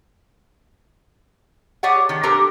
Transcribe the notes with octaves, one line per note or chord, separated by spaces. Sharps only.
G4 G#4 C#5 D5 F#5
D#3
D4 G4 A4 A#4 C5 A#5